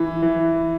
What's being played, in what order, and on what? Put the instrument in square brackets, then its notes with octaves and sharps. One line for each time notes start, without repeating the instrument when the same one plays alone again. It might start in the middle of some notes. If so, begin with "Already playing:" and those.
Already playing: [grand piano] E3
E3